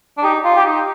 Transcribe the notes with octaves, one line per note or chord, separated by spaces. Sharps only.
D4
D#4 G4
F4
G4
D#4